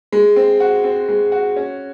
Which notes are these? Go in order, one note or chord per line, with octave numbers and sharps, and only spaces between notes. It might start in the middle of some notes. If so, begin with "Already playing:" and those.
G#3
C4
F#4
C4
G#3
F#4
C#4